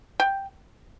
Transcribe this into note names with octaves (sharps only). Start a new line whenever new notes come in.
G5